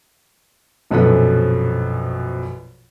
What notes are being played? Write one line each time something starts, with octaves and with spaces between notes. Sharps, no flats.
A#1 F#2 B2 F3 A4 B4